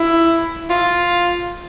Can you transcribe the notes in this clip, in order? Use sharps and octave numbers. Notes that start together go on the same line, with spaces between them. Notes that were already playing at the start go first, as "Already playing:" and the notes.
Already playing: E4
F4